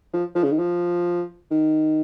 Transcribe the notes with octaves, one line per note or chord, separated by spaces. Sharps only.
F3
F3
C#3
D#3
F3
D#3